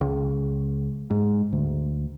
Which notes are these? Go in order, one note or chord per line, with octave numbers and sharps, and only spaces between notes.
C#2
G#2
D2